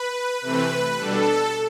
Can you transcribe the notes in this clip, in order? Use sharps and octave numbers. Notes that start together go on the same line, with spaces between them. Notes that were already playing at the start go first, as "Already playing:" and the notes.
Already playing: B4
C3 E3 A3 C4 B4
B2 G3 D4 A4